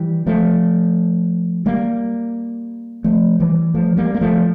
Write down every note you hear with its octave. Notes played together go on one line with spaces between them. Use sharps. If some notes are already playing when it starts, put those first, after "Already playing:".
Already playing: E3 G3
F3 A3
G3 A#3
F3 A3
E3 G3
F3 A3
G3 A#3
A#3
F3 A3